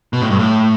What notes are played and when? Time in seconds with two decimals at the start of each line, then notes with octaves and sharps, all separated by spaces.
0.13 B2
0.21 A2
0.30 G2
0.39 A2